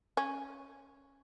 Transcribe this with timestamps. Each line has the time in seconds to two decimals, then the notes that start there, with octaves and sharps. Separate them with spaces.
0.17 C#4